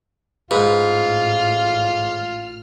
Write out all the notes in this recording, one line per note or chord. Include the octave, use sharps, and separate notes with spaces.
A1 G#2 F4 B4 F6